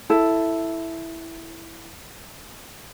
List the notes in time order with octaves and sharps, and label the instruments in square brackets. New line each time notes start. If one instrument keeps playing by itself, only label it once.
[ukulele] E4 A4